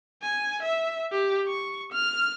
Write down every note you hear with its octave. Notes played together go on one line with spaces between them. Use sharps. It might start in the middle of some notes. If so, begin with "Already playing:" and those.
G#5
E5
G4
C#6
F6